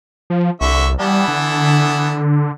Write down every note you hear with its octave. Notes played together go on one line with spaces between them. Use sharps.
F3
C2 D3 E5 C#6
E3 G3 B3 A5
D3